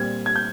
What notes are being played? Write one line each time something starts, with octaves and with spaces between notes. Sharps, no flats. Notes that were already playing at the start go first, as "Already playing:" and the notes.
Already playing: A#2 G3 C4 G#6
G#6
G6